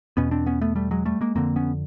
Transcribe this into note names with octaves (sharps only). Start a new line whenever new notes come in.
E2 B2 B3 C#4
C4 D4
B3 C#4
A3 B3
G3 A3
F#3 G#3
G3 A3
G#3 A#3
F2 D3 A#3 C4
B3 C#4